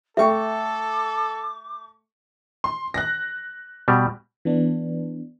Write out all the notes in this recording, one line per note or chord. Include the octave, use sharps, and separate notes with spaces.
A3 A4 E5 G5 C#6 D6
C6
F#6 A#6
B2 G3
E3 B3 D4